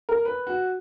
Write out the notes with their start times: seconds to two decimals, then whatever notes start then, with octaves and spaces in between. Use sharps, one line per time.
0.09 A#4
0.25 B4
0.47 F#4